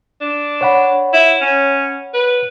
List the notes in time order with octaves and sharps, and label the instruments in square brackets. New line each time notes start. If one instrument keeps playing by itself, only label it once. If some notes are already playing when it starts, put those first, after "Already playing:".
[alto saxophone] D4
[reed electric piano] C#5 F#5 B5
[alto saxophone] E4
C#4
B4